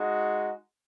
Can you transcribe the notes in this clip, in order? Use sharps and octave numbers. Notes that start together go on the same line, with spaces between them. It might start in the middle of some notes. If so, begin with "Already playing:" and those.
Already playing: G#3 D#4 F#4